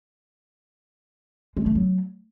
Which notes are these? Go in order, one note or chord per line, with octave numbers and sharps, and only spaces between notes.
G#3
A3
F#3